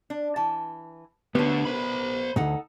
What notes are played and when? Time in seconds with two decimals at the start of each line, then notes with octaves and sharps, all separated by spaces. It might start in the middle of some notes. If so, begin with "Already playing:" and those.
0.10 D4
0.36 E3 A5
1.35 D2 D3 B3 G4 C#5
1.65 C5 B5
2.36 D2 G#2 D#4 A4 F#5